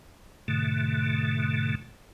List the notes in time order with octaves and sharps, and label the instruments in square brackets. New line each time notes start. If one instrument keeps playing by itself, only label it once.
[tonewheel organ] G#2 B2 D3 A3